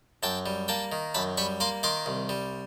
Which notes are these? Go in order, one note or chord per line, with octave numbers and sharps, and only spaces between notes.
F#2 G5 A5
G3
A#3 G5 A5
D#3
F#2 A5 B5
G3 B5 C#6
A#3 C6 D6
D#3 C6 D6
C2
G3